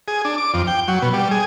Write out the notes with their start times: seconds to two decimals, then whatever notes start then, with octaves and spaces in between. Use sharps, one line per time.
0.08 G#4
0.25 D4
0.38 D6
0.54 F2
0.67 G5
0.88 F#3
1.02 B2
1.14 G3
1.31 G#4